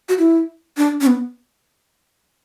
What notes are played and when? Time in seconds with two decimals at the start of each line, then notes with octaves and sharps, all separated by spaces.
0.09 F#4
0.19 E4
0.77 D4
1.01 C#4
1.07 B3